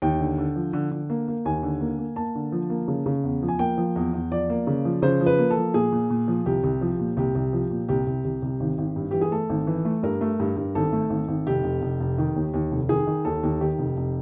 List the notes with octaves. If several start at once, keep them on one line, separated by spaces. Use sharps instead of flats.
D#2 G5
D3
D3
F3
D3
D3
A#3
A#3
D#2 G#5
D3
A#3
A#3
A#3 A5
D3
F3
A#3
C#3
C#3
E2
F3
G#5
A#3 G5
F3
E2
E2
F3 D5
A#3
C#3
F3
C#3 C5
F3
B4
A#3
A4
F3
A#2 G#4
A#2
A#2
F3
C2 G4
C2
F3
A#2
C2 G4
C2
F3
A#2
C2 G4
C2
C2
C2
G#1
G#1
G2
E3 G4
G#4
A3 A4
G#1
E3
A3
G2 A#4
A3
G2
G2
G#1 A4
A3
G#1
G#1
F1 G4
F1
F1
F1
D#3
D#2
D#2
F1
D#3 G#4
D#3
D#2 A4
D#2
D#3 G4
F1
F1